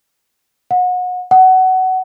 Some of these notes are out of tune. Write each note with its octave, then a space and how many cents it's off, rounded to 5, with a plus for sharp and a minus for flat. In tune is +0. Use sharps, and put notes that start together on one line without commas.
F#5 -30
F#5 +20